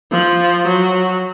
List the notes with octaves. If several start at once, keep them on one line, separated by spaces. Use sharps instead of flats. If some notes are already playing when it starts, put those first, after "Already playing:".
F3
F#3